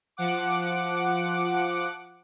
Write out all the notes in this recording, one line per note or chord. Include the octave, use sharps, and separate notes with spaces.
F3 F#5 D6